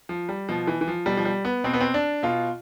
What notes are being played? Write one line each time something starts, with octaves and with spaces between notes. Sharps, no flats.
F3
G3
B2 F3
E3
E3
F3
B2 G3
F3
G3
B3
B2 C4
B3
C4
D4
B2 F4